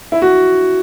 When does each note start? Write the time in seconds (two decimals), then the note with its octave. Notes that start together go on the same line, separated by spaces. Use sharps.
0.12 E4
0.22 F#4